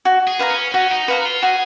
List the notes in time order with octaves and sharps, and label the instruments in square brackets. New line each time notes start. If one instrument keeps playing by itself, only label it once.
[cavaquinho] F#4
[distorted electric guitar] G#4
[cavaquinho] B4 F5 A#5
[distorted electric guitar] C#4
[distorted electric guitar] C#4 [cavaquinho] F#4
[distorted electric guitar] D#4
[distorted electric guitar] F#4 [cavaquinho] B4 F5 A#5
[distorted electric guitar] F4
[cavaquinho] F#4 [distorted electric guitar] G#4